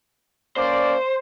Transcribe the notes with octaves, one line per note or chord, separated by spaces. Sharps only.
A#3 C#4 C5 D5